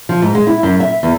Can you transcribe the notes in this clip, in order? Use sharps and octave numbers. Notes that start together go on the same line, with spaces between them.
F3
G#2
G#3
E4
F#2
E5
E2